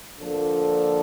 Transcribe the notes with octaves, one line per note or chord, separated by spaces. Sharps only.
D3 F3 A#3 D4 A4